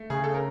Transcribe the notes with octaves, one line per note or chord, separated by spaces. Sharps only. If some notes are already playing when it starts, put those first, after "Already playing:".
Already playing: A3
C#3 G#4
A4
A#4